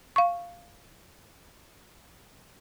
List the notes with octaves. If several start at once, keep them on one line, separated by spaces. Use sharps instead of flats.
F5 C#6